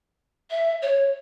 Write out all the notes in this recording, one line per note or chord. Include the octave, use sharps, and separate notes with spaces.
E5
C#5